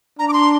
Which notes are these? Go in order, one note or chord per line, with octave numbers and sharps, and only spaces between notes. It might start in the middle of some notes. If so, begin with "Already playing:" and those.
D4 A#5
D6
C6